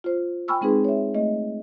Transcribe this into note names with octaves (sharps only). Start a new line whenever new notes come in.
F4 C5
G5 G#5 B5 C#6 E6 F6
G#3 C4 D#4 G#4 B4
C#5 E5
A3 D#5